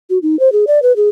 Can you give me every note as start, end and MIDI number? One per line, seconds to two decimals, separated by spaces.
0.10 0.18 66
0.22 0.38 63
0.39 0.52 72
0.52 0.65 68
0.67 0.82 74
0.82 0.95 71
0.96 1.09 68